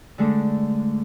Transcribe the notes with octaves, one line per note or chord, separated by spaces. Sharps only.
D3 G#3 A3 D4